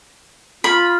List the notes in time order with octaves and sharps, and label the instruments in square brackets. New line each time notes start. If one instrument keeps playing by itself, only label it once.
[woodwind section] F4 [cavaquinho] B5